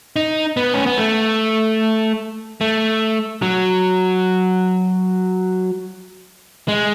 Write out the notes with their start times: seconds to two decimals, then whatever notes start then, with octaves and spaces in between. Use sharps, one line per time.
0.16 D#4
0.57 B3
0.74 C#4
0.86 B3
0.98 A3
2.61 A3
3.42 F#3
6.68 G#3